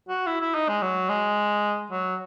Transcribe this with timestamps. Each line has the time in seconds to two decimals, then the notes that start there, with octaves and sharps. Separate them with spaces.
0.09 F#4
0.27 E4
0.41 E4
0.55 D#4
0.68 G#3
0.82 F#3
1.09 G#3
1.91 F#3